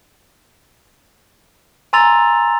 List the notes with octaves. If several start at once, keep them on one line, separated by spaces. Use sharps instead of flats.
G#5 A#5 C6 E6 A6 F7